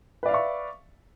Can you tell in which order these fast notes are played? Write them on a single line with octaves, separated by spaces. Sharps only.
B4 D5 F5 E5 C#6